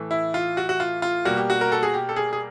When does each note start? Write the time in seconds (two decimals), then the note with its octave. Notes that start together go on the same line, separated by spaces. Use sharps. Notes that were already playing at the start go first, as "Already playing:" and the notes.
Already playing: A2 E3 A3
0.11 E4
0.34 F4
0.57 F#4
0.69 F#4
0.80 F4
1.02 F4
1.25 B2 G3 A#3 F#4
1.37 G4
1.50 F#4
1.61 A#4
1.72 A4
1.83 G#4
1.94 G4
2.09 A4
2.16 G#4
2.33 G#4